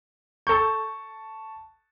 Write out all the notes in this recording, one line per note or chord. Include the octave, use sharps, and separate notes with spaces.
A4 A5 C#6 G6